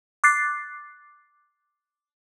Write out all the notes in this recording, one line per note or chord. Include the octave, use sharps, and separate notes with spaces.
D6 F#6 A6 C7